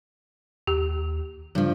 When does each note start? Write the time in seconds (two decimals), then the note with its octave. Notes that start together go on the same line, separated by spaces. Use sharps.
0.67 D#2 G4
1.55 G2 C#3 F3